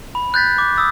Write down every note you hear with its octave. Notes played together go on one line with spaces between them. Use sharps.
B5
F#6 G6 A6 B6
D6
D#6 E6 A6